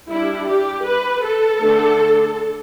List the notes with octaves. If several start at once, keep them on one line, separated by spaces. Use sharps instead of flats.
G3 D4 E4
G4
B4
A4
D3 A3 D4